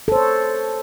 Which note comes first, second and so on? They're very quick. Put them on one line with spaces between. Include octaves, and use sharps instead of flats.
A4 C5 C#5